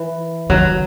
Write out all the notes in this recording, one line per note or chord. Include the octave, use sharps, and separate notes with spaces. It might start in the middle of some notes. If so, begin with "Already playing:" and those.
Already playing: E3
D#3 F#3